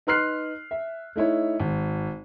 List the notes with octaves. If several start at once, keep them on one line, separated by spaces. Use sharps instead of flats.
D#4 B4 C6 F6 F#6 C7
E5
A3 D#4 E4 C#5
G#1